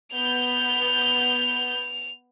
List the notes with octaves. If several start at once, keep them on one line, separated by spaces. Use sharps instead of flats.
B3 G6 F7